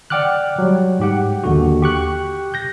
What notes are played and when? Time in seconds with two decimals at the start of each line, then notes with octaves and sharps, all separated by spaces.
0.10 D5 F#5 G5 D6 F6 F#6
0.58 F#3 G3
0.99 G#2 G4 F#5
1.44 D#2 D3 F#4
1.82 G4 C#6 F#6
2.54 G6 A#6